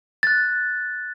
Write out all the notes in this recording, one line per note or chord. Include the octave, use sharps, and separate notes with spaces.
F#6 A6